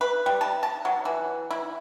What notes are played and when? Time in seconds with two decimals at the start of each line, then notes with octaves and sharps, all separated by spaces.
0.01 B4
0.26 G3
0.41 A5
0.63 A5
0.85 F#3
1.05 E3
1.51 E4